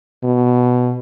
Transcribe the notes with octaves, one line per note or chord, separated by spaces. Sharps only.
B2